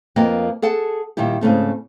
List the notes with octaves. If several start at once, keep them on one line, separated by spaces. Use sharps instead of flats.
F2 F3 A#3 B3 D#5 G5
G#4 A4 F#5 A5
A#2 D#3 G3 E4 G4
G#2 C#3 A3 C4